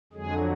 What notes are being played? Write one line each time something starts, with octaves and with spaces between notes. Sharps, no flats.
F2 D3 F#3 G#3 G#4